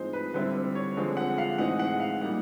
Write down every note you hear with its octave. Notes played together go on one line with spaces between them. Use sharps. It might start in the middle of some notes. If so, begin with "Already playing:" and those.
Already playing: A2 F3 G#3 C4 D#4 C5
B4
D3 G3 C4 E4 B4
C#5
D3 F3 G#3 C4
F#5
F5
A2 E3 G#3 C4 D#4 F#5
F#5
F5
A#2 G3 A#3 D#4 F#5